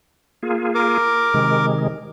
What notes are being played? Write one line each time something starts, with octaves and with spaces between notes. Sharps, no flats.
A#3 F4 G#4
A#4 D6
C3 D#3 G#3